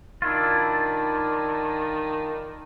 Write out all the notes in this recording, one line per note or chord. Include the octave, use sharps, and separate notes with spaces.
D#3 D4 E4 F4